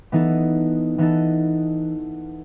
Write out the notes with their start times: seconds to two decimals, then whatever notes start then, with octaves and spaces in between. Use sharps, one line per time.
0.12 E3 B3 D#4 A4
0.98 E3 B3 D#4 A4